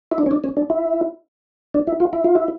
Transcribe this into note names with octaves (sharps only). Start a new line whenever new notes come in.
E4
D4
C#4
D4
C#4
D4
E4
D4
E4
F4
E4
F4
E4